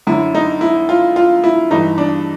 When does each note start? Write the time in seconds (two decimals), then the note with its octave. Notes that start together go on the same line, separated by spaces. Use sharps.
0.07 F#2 D3 E4
0.35 D#4
0.61 E4
0.89 F4
1.16 F4
1.44 E4
1.71 G2 E3 D#4
1.98 D4